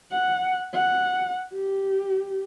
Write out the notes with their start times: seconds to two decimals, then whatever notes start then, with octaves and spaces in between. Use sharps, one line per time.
0.11 F#5
0.73 F#5
1.55 G4